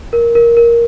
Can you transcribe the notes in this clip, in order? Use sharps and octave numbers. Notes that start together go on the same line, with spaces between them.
A#4
A#4
A#4